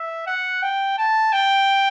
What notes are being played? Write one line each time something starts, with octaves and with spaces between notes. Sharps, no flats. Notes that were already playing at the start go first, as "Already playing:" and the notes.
Already playing: E5
F#5
G5
A5
G5